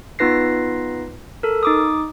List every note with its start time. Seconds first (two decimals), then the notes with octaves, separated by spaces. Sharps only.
0.19 B3 D#4 F4 B4 A#6 C7
1.43 A4 A#4
1.63 D#4 D6 D#6